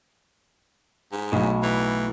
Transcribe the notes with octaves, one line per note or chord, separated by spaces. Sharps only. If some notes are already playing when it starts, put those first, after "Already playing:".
G#2
B1 A2 F#3
E3